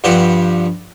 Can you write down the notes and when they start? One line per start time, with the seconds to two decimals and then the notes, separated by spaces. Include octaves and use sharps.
0.04 G2 F3 G4 F#5